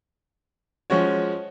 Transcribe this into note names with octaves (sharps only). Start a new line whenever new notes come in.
F3 G#3 C#4 F#4 C#5